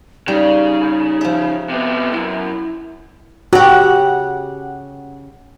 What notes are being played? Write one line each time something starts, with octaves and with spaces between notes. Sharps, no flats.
C#3 G3 D#4
F3 E5
C3 B3
C#2 F#2 E4
C#3 F#4 G4 F#5